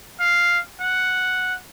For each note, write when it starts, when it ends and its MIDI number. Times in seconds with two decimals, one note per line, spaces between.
0.20 0.58 77
0.81 1.54 78